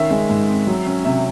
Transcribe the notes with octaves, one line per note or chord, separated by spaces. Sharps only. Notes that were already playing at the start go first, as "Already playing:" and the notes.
Already playing: D#3 C#4 E5
G#3
G#2
C4
F#3
C#4
C3 E5